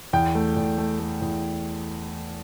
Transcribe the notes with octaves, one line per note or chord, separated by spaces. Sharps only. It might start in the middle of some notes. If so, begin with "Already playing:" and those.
E2 G5
A3
E2
A3
A3
E2